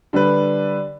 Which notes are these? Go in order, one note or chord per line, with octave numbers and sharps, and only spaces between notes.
D3 G3 D4 B4